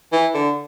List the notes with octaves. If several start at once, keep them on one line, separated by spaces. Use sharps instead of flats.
E3
D3